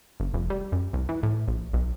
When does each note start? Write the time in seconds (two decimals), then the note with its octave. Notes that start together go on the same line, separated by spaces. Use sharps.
0.20 G1
0.34 F1
0.50 G3
0.72 F#2
0.93 C2
1.09 E3
1.23 A2
1.48 A#1
1.73 B1